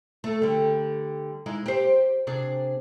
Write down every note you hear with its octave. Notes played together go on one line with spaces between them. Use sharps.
A3
D3 G3
G#3 D#4 E4
G4 C5
C3 D4 G#4